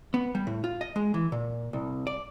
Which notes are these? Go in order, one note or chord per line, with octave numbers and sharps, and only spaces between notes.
B3
G3
A2
F4
D#5
G#3
E3
A#2
C2
D5